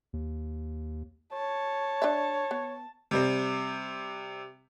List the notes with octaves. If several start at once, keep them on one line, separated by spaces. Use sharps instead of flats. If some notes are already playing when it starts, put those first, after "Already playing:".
D#2
C#5 A5
D4 E5
B3
C3 G3 C4